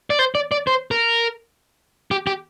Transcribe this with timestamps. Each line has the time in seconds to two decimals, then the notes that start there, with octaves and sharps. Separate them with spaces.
0.10 D5
0.19 C5
0.35 D5
0.52 D5
0.67 C5
0.91 A#4
2.11 G4
2.27 G4